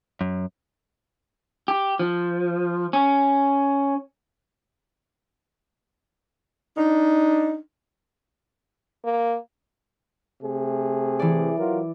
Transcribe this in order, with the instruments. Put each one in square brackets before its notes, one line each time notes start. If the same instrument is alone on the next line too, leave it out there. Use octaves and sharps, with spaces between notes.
[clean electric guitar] F#2
[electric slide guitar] G4
F3
C#4
[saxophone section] D4 D#4
[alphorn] A#3
[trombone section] C3 A3 G#4
[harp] E3 D5
[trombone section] F#3 F4 A#4